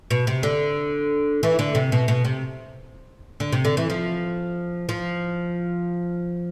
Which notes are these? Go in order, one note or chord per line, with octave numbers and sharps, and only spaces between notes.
B2
C3
D3
E3
D3
C3
B2
B2
C3
D3
C3
D3
E3
F3
F3